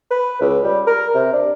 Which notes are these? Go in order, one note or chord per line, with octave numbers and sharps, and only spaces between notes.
B4
C#2
G3
A#4
C3
D4